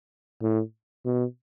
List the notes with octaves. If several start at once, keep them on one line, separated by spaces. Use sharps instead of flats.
A2
B2